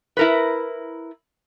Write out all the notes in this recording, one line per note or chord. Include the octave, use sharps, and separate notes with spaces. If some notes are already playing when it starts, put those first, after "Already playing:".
E4 A#4 B4